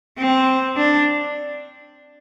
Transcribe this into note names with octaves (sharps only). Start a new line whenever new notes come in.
C4
D4